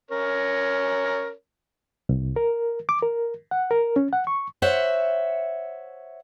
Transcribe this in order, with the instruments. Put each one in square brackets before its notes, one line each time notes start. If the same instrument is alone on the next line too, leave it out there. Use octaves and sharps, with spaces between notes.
[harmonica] C#4 A#4 C#5
[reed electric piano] C2
A#4
D6
A#4
F#5
A#4
C#4
F#5
C#6
[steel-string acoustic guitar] C5 C#5 E5 F#5